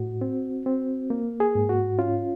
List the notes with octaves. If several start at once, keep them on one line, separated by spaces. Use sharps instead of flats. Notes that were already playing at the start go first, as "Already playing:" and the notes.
Already playing: A2 F#4
C4
C4
A#3
G#4
G#2
F#4
C#4 F4